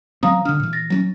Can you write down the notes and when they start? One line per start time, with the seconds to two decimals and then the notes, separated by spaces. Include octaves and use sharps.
0.23 D#3 F#3 C4 F5 A#5 D#6
0.45 D3 D4 F6
0.60 A#2 E3
0.73 A6 A#6
0.90 F#3 C4 C#4